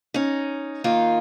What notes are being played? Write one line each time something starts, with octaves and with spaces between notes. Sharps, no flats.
C#4 D#4
D#3 A#3 D#4 F4